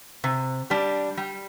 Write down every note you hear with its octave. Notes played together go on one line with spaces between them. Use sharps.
C3
G3 D4 G4
G3